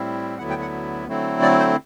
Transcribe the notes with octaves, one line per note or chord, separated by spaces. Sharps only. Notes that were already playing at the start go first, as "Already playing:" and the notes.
Already playing: A2 G3 C4 E4
D2 D3 F#3 B3 E4 F#5
G5
F#5
D3 F#3 A3 C4 E4
D5
C5